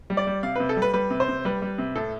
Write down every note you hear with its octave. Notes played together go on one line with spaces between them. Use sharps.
G3
D5
G3
C3 F5
C3 B4
A4
G3
B4
G3 B4
C3
C5
C3
G3 B4
G3
C3
A2 A4